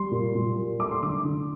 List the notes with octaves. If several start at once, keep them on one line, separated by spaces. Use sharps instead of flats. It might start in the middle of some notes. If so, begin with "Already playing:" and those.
Already playing: G3 C6
A#2
A#2
G3
A3 D6
C6
D3 D6
D3